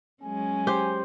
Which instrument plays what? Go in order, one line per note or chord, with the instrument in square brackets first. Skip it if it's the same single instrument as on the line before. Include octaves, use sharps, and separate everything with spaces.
[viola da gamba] F#3 G#3 C#4 [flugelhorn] G#5
[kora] G4 [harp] C5